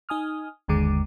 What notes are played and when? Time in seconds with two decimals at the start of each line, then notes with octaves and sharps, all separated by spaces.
0.09 D#4 G#5 D#6 F6
0.68 G1 D#2 D3 G#3 D6